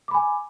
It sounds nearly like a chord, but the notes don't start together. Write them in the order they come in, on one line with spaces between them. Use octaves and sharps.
D6 B5 G#5